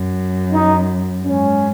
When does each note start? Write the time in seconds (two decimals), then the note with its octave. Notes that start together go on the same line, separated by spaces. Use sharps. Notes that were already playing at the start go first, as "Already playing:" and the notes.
Already playing: F#2
0.52 D#4
1.25 G#2 C#4